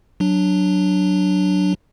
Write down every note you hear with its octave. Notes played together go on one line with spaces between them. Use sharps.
F#3 D4